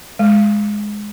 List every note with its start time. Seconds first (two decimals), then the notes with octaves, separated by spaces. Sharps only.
0.19 G#3